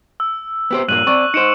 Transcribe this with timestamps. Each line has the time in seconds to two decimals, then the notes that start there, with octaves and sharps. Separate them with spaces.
0.20 E6
0.71 B3 G4 C5
0.88 G2 A#2 A#3 F#6 D#7 F#7
1.07 C4 D5 C#6
1.34 D#4 C5 C#7 D7 E7